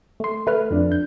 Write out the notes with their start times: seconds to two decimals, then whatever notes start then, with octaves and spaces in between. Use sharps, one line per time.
0.20 A3 C6
0.47 A3 B4 F6
0.71 F2 D4
0.92 G6